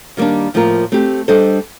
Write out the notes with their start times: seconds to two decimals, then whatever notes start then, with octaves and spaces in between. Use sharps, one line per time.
0.17 D#3 G3 A#3 D4
0.54 A2 F3 A#3 F4 A#4
0.92 A3 C4 G4
1.28 G3 D4 A4 C5 D#5